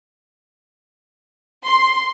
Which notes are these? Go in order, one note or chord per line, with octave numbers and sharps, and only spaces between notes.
C6